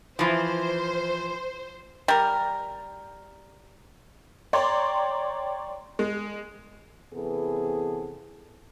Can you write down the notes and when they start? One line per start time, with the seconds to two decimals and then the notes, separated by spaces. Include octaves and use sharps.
0.19 E3 F3 C5
2.08 G3 A#4
4.53 C#5 D5 G5 A#5 C6
5.99 G#3
7.14 C3 E3 B3 G#4 A4